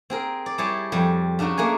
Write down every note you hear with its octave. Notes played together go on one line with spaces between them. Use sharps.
C4 G#4 A#4
D5
G3 E4 G4 G#4 C#5 A5
F2 G3
C#3 D4 D#4 F#4
A3 A#3 G#4 G#5